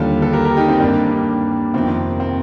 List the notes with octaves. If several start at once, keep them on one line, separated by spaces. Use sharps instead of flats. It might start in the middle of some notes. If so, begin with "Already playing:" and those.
Already playing: D#2 D3 G3 F4 A4
A4
G4 A#4
G4 A#4
D#4 G4
C4
G2 D#3 G3 A#3 D4
F2 C3 D#3 C4
C4